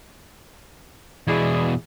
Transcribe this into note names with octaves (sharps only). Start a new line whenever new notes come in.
E2 B2 E4 G#4 D5